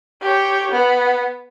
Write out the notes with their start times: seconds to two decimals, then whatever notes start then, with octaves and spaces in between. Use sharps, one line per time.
0.22 G4 C#5
0.71 B3